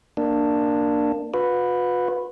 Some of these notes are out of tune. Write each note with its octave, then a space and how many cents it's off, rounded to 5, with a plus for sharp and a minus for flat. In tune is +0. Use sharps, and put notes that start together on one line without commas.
A#3 +0 D4 +10
F#4 -45 B4 +5